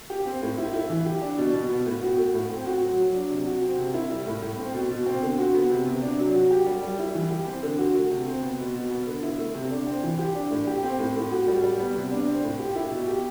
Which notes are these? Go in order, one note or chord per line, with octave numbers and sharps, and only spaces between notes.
G4
C4
A2
E4
E4
E3
G4
D4
B2
B2
B3
A2
F#4
A3
A2
C4
F#4
F#3
F#3
D4
C3
F#4
C4
C3
E4
G3
A2
A2
C4
B2
B2
C4
D3
F#4
B3
C3
C3
D4
F#3
F#4
G4
G3
G3
E4
E3
G4
C4
D3
F#4
A3
C3
C4
B3
B2
B2
B3
D3
E4
A3
C3
D4
C4
E3
G4
D4
A2
G4
C4
A2
A2
F#4
G3
G3
B3
C3
D4
C4
A2
G4
E4
B2
G4